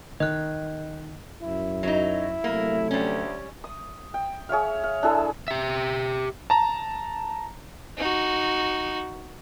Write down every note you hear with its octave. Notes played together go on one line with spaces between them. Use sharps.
D#3 D#5 F#6
F#2 E4
F#3 D#4
C3 F#3 A3 A#3
D2 G3 C#4
D#6
G5
G#4 C#5 E5 F5
F5
D4 E4 G#4 A4
G4 E5
A5 A#5
D#4 F#4